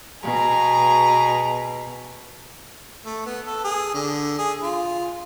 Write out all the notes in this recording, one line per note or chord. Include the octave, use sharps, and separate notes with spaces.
B2 G#4 A#5
A3
B3
A4
G#4
D3
G#4
F4